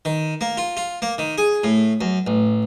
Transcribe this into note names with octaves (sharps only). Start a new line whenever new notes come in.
D#3
A#3
F4
F4
A#3
D#3
G#4
A2
F#2
A1